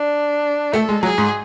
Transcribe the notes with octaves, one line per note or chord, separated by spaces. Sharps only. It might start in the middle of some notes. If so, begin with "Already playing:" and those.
Already playing: D4
A3 A4
G#3
F#3 G#4
G#2